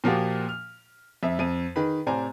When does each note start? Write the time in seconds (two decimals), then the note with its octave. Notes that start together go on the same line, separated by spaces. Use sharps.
0.04 A#2 F3 A#3 F#4 G4
0.49 F6
1.23 F2 E5
1.39 F2 D#7
1.76 D#3 G#4 B4 B5
2.07 A2 C3 C5 D5 G#5 A#5